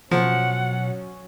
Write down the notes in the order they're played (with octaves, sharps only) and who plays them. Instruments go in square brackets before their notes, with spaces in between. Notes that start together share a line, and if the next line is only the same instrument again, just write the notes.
[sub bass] B2 [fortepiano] F3 [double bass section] F#3 C#4 [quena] F#5